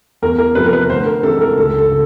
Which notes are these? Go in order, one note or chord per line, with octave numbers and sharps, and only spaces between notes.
E2 A#4
A#4
C3 F3 B4
A#4
B4
D2 C5
A#4
C3 E3 G#3 A4
A#4
C#2 A4
A4
C#3